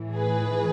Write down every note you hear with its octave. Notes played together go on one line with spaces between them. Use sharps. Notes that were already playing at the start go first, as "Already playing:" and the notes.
Already playing: A2 E3
G#4 B4